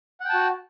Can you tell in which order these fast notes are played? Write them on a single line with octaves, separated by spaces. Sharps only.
F#5 G5 A5 F#4